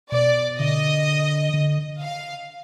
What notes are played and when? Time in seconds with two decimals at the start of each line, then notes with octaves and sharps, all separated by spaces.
0.12 B2 D5
0.59 D3 D#5
1.54 D3
2.00 F5